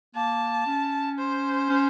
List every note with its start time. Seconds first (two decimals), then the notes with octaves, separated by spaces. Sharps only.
0.15 A#3 A5
0.66 C#4
1.19 C5
1.69 C#4